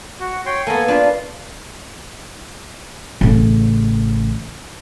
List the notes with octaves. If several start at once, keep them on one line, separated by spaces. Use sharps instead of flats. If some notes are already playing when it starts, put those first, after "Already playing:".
F#4
C#5 G5 C6
A#3 B3 A4 G#5
D4 F4 B4
A1 C#3